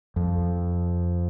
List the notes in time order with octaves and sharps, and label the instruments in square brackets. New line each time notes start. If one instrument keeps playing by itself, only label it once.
[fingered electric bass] F2